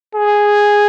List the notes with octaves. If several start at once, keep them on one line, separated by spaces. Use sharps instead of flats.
G#4